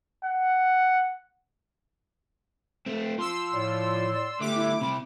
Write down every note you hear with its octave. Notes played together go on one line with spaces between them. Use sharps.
F#5
A3 C4
F3 C6 E6
A2 D5
D3 G3 A3 D6
E4
C3 E4 B5